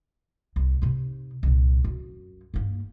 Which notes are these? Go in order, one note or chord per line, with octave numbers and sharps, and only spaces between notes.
C2
C3 D#4
C2 A#2
F#2
G2 A#3